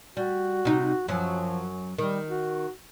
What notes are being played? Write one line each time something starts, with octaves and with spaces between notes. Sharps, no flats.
G3 F#4
C3 D#4
F#2 F3 F#3
D#3 G3
F#4